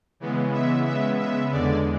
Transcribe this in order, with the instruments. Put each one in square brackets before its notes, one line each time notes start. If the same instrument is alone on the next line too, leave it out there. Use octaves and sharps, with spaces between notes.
[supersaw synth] C#3 E3 G#3 B3
E5
C#3 G#3 B3 E5
E5
E2 D3 G#3 D5